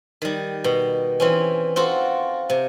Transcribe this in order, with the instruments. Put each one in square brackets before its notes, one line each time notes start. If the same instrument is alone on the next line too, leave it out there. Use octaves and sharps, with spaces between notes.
[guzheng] D#3 G3
B2
E3 C4 C#4
C4 F4 F#4 A4
C3